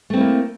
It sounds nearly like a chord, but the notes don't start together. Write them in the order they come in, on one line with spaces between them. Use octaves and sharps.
A3 C4 E4 A#3